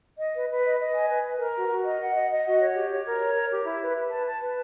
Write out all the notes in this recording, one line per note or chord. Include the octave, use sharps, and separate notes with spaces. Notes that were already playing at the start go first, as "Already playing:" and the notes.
D#5
B4
B4
D#5
D#5
G#5
B4
B4
A#4
F#4
F#4
D#5
F#5
D#5
D#5
F#4
C#5
G4
C#5
A#4
C#5
A#4
G4
E4
B4
B4
A5
A5
B4